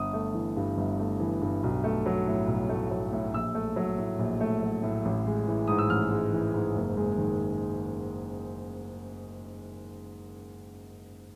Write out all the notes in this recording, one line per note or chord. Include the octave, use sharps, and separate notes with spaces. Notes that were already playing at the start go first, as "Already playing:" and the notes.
Already playing: G1 D#6
A3
E3
G2
G1
A3
E3
G2
B1
A3
F#3
A2
B1
A3
F#3
A2
A#1 E6
A3
F#3
A2
A#1
A3
F#3
A2
A1
G#3
E3
G#2 D#6
E6
A1 F6
G#3
E3
G#2
F#1
G#3
D#3